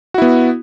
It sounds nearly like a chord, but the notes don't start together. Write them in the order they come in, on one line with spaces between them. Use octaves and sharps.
F#4 E4 B3